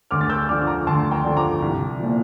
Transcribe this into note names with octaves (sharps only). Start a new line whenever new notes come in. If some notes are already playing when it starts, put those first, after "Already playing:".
D2 D6 F6
A6
E6 G6
D3 F3 D6 F6
A#5 D6
D2 A5 C6
G5 A#5
D3 F3
A#5 D6
C2
A#2 F3